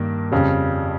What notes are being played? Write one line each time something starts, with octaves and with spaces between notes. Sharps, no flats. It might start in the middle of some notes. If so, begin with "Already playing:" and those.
Already playing: G2 D#3 A#3
F2 C#3 G3